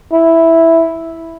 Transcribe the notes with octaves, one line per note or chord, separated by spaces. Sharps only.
E4